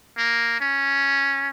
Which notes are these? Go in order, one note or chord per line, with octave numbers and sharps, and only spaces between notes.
A#3
C#4